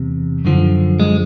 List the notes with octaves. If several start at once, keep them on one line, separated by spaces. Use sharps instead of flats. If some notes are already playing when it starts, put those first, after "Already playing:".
Already playing: E2 C3
F#2 D3 F3
G#3